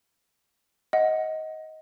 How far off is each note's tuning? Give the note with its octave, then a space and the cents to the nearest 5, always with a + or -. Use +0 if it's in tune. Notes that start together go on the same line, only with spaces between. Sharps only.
D#5 +15 F#5 +0